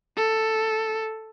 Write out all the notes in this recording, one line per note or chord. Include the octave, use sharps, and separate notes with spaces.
A4